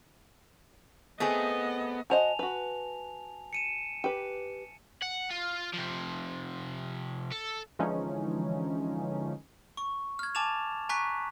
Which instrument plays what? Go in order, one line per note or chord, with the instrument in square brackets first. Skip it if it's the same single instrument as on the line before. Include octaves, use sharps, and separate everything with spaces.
[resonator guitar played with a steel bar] A3 C4 G#4 [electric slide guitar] B3 [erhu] D#5
[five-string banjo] F#4 C5 D#5 [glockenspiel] G#5 A5 F7
[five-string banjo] F#4 B4
[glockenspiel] C#7 D#7 E7
[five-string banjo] G4 B4
[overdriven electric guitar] F#5
F4
C3 F3
A4
[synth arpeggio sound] D3 E3 F3 G#3 C#4 D#4
[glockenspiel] C#6
F6 G#6
G#5 A5 D6 A6 E7 F7
G#5 A#5 C#6 F#6 B6